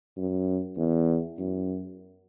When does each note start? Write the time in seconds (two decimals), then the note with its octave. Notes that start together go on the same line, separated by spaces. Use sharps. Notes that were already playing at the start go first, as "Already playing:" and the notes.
0.17 F#2
0.77 E2
1.39 F#2